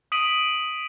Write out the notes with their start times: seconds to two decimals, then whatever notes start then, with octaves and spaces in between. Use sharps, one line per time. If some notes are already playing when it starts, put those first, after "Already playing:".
0.12 D#6 B6 D7 D#7 F#7